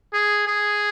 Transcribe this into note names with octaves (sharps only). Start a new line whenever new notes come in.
G#4
G#4